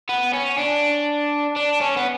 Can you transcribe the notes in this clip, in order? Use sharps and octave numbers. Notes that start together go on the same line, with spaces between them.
B3
C#4
D4
D4
C#4
B3